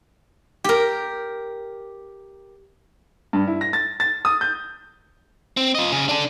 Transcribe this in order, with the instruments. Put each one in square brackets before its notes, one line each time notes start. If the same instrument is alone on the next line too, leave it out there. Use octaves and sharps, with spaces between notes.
[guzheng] G4 A#4
[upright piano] G2
E4
A#6
A6
A6
D#6
G6
[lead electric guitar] C4
F4 D#5
C#3 G#4
D4 A4